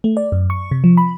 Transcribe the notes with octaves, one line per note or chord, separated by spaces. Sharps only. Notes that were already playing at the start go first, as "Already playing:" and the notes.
A3
D5
F#2
C#6
C3
F3
B5